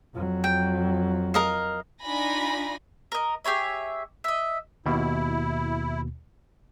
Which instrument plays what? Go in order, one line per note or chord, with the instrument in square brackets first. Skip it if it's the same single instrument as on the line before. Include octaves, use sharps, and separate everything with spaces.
[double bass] F2 F#3
[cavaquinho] G5
A#4 D#5 F5
[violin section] D4 D#4 F4 G#5 B5 A#6
[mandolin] A#4 D#5
G4 G#4 C#5 E5
D#5 E5
[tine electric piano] D#2 B2 [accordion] E4